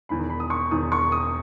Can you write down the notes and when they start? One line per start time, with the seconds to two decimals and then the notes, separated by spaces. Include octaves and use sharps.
0.09 E1 E2 D#3 B5
0.30 B5
0.40 D#6
0.50 C#6
0.71 E1 E2 D#3 D#6
0.92 C#6
1.12 D#6